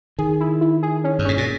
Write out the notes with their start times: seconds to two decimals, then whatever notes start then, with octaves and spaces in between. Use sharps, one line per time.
0.19 D#3 G#4
0.40 E4
0.61 E4
0.83 G#4
1.04 C#4
1.19 G2
1.25 G#2 C#4
1.38 A#2